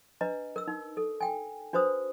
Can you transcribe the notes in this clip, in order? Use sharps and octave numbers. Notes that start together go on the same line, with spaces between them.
D4 B4 D#5 A#5
A#4 E6
D#4
A4
G5 G#5
D4 F#4 B4 C5 D#6